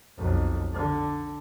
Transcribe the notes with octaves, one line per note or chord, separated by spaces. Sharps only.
B1 F2
D3